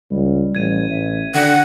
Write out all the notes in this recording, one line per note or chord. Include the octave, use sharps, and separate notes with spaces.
C#2 G3
A1 G#6 D#7
A1 E5
D3 F#5 G5